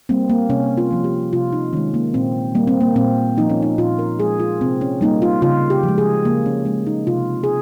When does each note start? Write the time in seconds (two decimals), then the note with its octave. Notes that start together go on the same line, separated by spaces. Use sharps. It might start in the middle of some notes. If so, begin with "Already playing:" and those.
0.09 G3 A#3 C4
0.30 A#3
0.49 C3 C#4
0.77 F4
0.91 F3 A#3
1.04 G4
1.33 C3 F4
1.53 D#4
1.73 D#3 G#3 C#4
1.94 A#3
2.14 A#2 C4
2.55 G3 A#3
2.67 C4
2.81 A#3
2.96 A#2 C4
3.37 F3 A#3 D#4
3.50 C#4
3.62 D#4
3.78 A#2 F4
3.99 A#4
4.19 F3 G#3 G#4
4.40 F4
4.61 C3 C4
4.81 C#4
5.01 G3 A#3 D#4
5.22 F4
5.42 C#3 F4
5.70 G4
5.83 F3
5.88 G#3
5.98 G#4
6.25 C#3 A#3
6.46 C#4
6.65 G#3 C#4
6.87 D#4
7.07 C3 F4
7.44 G#4